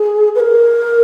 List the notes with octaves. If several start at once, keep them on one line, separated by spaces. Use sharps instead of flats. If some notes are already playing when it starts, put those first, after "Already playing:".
Already playing: G#4
B4
A#4